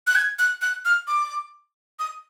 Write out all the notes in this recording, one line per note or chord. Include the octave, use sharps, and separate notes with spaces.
F#6
G#6
F#6
F#6
F6
D6
D#6